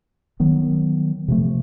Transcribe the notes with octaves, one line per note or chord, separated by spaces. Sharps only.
D#3 F#3 B3
C3 F3 A3